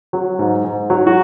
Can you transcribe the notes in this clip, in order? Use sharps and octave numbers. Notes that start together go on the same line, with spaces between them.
F#3
G#2
G#2
F#3
F#4